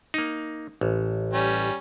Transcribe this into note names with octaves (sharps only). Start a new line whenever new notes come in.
A#3 D#4
A1
G3 C#4